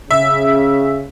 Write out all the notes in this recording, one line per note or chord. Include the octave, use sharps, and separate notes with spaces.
C#3 E5